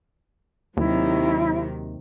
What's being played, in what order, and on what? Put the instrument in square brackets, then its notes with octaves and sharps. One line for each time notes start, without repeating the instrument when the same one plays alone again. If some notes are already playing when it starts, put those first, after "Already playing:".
[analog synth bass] D#2 [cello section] C3 D#3 F#3 [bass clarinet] E4